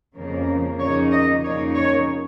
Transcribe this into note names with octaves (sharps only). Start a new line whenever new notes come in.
F2 C#3 F3 A#3
F2 C#3 A#3 D#4 C#5
D#5
F2 C#3 A#3 D#4 C#5
C#5